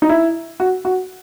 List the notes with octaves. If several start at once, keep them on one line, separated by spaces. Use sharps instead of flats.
D#4
E4
F#4
F#4